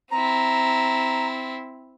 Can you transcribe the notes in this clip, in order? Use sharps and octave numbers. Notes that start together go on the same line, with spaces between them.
C4 E4 A#5